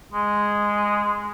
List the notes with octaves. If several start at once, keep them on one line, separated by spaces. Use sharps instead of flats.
G#3